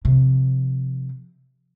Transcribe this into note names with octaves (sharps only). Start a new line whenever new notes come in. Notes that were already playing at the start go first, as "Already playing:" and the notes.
C3 F3